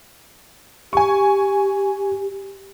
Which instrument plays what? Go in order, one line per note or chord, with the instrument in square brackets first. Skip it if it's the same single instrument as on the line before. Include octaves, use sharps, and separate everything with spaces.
[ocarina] G4 [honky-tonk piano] G#5 C#6